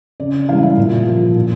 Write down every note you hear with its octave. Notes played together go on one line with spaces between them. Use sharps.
C#3 D5
E3 G3 F5
E5
A#2
F3
A#2